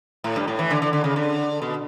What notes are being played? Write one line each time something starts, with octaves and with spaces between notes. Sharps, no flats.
A2
G2
A2
E3
D3
D3
D3
C#3
D3
B2